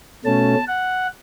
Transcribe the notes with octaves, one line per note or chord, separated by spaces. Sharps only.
B2 A3 C#4 A5
F#5